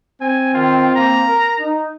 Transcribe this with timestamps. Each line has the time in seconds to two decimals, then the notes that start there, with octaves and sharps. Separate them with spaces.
0.21 C4 G#5
0.54 D#3 F4
0.96 A#3 A#5
1.27 A#4
1.60 D#4